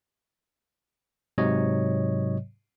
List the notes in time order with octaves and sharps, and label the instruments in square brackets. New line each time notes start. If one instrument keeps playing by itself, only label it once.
[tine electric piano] G#2 C3 F#3 C#5 D#5